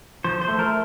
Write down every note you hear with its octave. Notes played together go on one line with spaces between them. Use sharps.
F3 C5
C5
A3
A#4